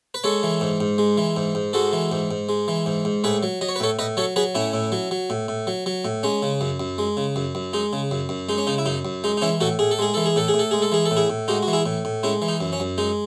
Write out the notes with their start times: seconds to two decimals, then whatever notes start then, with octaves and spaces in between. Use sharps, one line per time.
0.14 B4
0.24 G#3 A4 C#5
0.43 E3
0.61 G#2
0.81 G#2
0.98 G#3
1.18 E3
1.37 G#2
1.55 G#2
1.73 G#3 F#4 A4
1.93 E3
2.12 G#2
2.31 G#2
2.49 G#3
2.68 E3
2.86 G#2
3.05 G#2
3.24 A2 G#4 B4
3.43 F#3
3.61 F#3 D#5
3.69 C#5
3.76 B4
3.80 A2 A4 C#5
3.99 A2 B4 D#5
4.17 F#3 A4 C#5
4.36 F#3 G#4 B4
4.55 A2 C#4 E4
4.74 A2
4.92 F#3
5.11 F#3
5.30 A2
5.48 A2
5.67 F#3
5.86 F#3
6.05 A2
6.23 G#3 C#4
6.43 C#3
6.61 F#2
6.80 F#2
6.98 G#3
7.17 C#3
7.36 F#2
7.55 F#2
7.73 G#3 D#4
7.93 C#3
8.11 F#2
8.29 F#2
8.49 G#3 D#4
8.58 C#4
8.67 C#3 D#4
8.78 E4
8.86 F#2 D#4
9.05 F#2
9.24 G#3 D#4
9.37 D#4
9.42 E3 C#4 E4
9.60 A2 F#4 A4
9.79 A2 G#4
9.91 A4
9.99 G#3 G#4
10.14 E3 A4
10.26 G#4
10.36 A2 A4
10.48 G#4
10.54 A2
10.59 A4
10.71 G#3 G#4
10.82 A4
10.92 E3 G#4
11.05 A4
11.11 A2
11.17 E4 G#4
11.30 A2
11.48 G#3 D#4 F#4
11.63 F#4
11.68 E3
11.73 E4 G#4
11.86 A2
12.05 A2
12.23 G#3 C#4 E4
12.42 E3
12.48 D#4
12.61 F#2
12.73 C#4
12.80 F#2
12.98 G#3 D#4